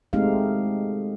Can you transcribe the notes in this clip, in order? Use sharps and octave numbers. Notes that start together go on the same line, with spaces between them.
G#3 A3 C4 D#4 G4 F5